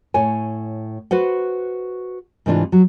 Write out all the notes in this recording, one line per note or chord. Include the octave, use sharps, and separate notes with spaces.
A2 C#5 G#5
F#4 B4 C5 F#5
G#2 C3 E3 D4 F4
F#3